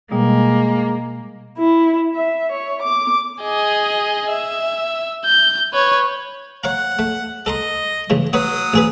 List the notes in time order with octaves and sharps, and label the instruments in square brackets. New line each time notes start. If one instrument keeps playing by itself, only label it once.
[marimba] B2 G3 [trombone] G#3 [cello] A#3
[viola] E4
E5
C#5
D6
[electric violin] G#4 D#5
E5
G6
B4 C#5
[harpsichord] C#5 F5 A#5 [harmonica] F#5
[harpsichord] A3
[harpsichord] A4 A#5 C6 [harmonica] D#5
[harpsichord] G2 C#3 E3
[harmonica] F#3 D#6 [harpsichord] B4 C#5 F#5
[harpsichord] A1 G#4 B4